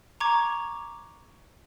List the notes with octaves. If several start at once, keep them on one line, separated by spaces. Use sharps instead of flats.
A#5 C#6 D6 G#6